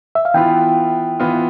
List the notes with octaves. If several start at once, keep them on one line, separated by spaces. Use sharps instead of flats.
E5
F5
E3 B3 F4 G5
E3 B3 F4